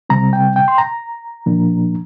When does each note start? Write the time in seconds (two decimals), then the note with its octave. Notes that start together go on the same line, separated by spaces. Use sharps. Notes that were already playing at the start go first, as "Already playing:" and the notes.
0.09 C3 G3 C4 A#5
0.33 G5
0.56 G5
0.68 C6
0.78 A#5
1.46 A#2 F3 A#3 D4